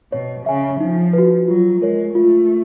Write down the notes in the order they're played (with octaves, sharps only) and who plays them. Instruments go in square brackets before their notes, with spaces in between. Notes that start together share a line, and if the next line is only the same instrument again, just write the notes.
[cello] B2 [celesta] C#5
[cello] C#3 [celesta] E5 G#5
[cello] F3 [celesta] D#4
[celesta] F#4 B4
[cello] F#3 [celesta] F4
[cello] G#3 [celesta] A#4 C#5
[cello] A3 [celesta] F4